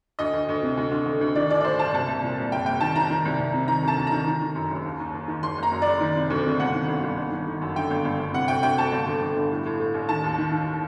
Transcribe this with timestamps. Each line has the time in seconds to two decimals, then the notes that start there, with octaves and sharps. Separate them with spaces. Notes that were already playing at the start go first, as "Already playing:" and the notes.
0.19 D2 D#5
0.33 D2
0.49 D2
0.63 C3
0.77 D2
0.91 D3
1.06 D3
1.21 D2
1.35 D#3 D5
1.50 A1 D5
1.60 D5
1.65 A1 C5
1.79 G2 A5
1.93 C2 A5
2.08 C2
2.23 A#2
2.38 C2
2.52 F#1 G5
2.66 F#1 G5
2.81 D#3 A5
2.96 D#3 A#5
3.10 D#3
3.25 C2
3.40 C2
3.54 C3
3.68 D#3 A#5
3.83 D2 A5
3.98 D2
4.07 A#5
4.12 D#3
4.27 D#3
4.41 D#3
4.55 F#2
4.71 F#1
4.85 D#2
5.00 D#2
5.14 D#2
5.28 D#3
5.42 F#1 C6
5.58 F#1 A#5
5.72 F#2
5.82 F#1 D5
6.01 D#3
6.16 C3
6.30 D2
6.45 C3
6.60 G1 F#5
6.75 D#3
6.88 G1
7.03 G1
7.17 G1
7.32 D#3
7.47 D#3
7.61 F#2
7.76 D3 G5
7.90 G1
8.05 G1
8.19 G1
8.33 C3 F#5
8.48 D2 G5
8.63 D2 G5
8.78 D2 A5
8.92 G1
9.07 D3
9.22 D3
9.36 G1
9.51 A2
9.66 A2
9.80 A2
9.94 A1
10.09 D#3 A5
10.24 D#2
10.38 D#3
10.52 D#3